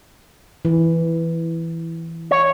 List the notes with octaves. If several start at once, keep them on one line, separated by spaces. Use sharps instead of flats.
E3
C#5